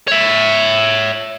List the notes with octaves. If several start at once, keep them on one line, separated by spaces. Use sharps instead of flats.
C#5 E5